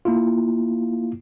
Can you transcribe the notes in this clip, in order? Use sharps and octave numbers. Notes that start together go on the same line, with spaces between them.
A#3 E4 F4